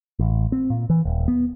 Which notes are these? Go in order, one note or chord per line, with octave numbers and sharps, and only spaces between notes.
A1
C4
A#2
E3
D#1
B3